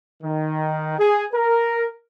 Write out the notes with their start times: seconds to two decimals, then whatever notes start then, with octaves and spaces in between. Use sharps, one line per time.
0.23 D#3
0.98 G#4
1.32 A#4